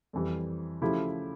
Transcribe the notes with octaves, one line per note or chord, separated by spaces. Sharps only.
F2 E3 G3
C#3 F3 A3 E4 G4